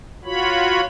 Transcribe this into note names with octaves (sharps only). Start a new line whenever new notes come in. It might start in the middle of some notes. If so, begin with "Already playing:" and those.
F4 F#4 C#5 B5